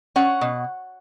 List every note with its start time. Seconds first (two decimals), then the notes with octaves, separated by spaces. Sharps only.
0.16 C#4 F#5
0.41 B2